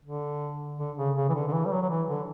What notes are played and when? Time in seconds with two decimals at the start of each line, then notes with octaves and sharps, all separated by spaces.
0.05 D3
0.79 D3
0.98 C#3
1.15 C#3
1.29 E3
1.34 D3
1.48 D3
1.53 E3
1.65 G3
1.71 F#3
1.82 F#3
1.90 E3
2.08 D3